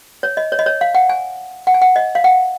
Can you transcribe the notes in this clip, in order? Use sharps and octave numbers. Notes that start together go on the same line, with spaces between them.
C#5
D#5
C#5
D#5
C#5
F5
F#5
G#5
F#5
G#5
F#5
D#5
F5
F#5